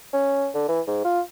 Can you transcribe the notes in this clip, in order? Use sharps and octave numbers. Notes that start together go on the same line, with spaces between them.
C#4
D3
E3
G#2
F4